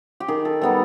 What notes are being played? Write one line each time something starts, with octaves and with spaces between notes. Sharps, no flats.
G4
D#3 G#4
A4
G3 B3 D#4 A4